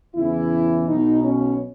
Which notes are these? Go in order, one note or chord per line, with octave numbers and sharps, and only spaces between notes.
E2 C#3 E3 E4
B1 B2 D#4
C#4